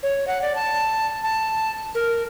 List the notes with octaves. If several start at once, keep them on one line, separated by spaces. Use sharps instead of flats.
C#5
F#5
D5
A5
A5
A#4